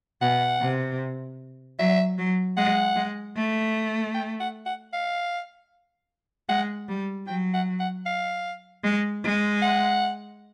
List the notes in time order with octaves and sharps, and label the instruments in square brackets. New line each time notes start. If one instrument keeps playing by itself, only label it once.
[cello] B2 [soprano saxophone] F#5
[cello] C3
[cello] F#3 [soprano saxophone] E5
[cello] F#3
[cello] G#3 [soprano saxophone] F#5
[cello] G#3
A3
[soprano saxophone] G5
F#5
F#5
F5
[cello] G#3 [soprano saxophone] F#5
[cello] G3
[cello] F#3 [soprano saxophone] G5
[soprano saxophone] F#5
F#5
F5
[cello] G#3
G#3
[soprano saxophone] F#5